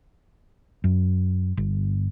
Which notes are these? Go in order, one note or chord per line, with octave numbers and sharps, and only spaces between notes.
F#2
G1